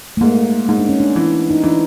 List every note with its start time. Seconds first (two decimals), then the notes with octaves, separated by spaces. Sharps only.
0.17 A3
0.21 G#2 A#3
0.69 G#2 D#4
0.79 D4
0.89 C#4
1.00 D4
1.15 E3 C#4
1.50 D#4
1.63 E3 D4